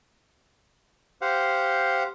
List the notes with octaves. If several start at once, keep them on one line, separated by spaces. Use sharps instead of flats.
G4 C5 F5 F#5